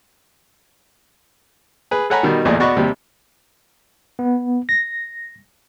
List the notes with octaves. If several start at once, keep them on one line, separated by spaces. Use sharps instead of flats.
G#4 B4
A4 C#5 F#5 G#5 A#5 B5
B2 D#3 G3
A1 E2 A#2 G#4 D5 D#5
B2 B3 F#4 D5 D#5 C#6
D#2 C3 G3
B3
A#6